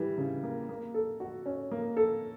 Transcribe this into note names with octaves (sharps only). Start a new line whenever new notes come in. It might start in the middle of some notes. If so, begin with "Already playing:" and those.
Already playing: E3 G3
C#3
A#3
A#3
A4
F#4
C#4
A#3
A4